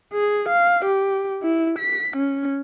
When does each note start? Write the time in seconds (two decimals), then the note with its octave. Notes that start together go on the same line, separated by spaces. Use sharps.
0.13 G#4
0.49 F5
0.85 G4
1.43 E4
1.79 B6
2.17 C#4